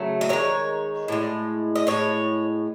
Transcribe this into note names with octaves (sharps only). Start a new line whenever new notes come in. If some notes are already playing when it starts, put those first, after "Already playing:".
Already playing: C#3 F#3 A3
D#5
D#3 G#3 C#5
A2 G#3
D#5
A2 G#3 C#5